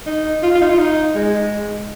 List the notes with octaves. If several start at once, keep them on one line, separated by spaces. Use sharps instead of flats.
D#4
F4
F4
D#4
F4
D#4
G#3